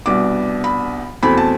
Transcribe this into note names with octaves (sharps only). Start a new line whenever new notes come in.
C2 B2 B3 D4 D6
B5
E2 B2 A3 C4 B5
A5